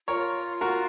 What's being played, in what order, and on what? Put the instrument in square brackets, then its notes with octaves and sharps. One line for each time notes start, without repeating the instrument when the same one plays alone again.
[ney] F4 [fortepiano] A#4 C#5
[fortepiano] F#4 A#4